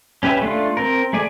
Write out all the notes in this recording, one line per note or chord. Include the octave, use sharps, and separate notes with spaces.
C#4 G4 B4 E5
A3 D4 F4
C4 A#4
A3 G#4 D5 G#5